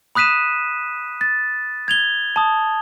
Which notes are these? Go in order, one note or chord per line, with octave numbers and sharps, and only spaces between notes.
B5 D#6 F#6 B6 D#7 E7
A6
G#6 F7 G7
A5 D#6